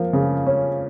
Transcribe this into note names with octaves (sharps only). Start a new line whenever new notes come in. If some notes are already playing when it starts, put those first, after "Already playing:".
Already playing: F3 A#3
C#3
C#4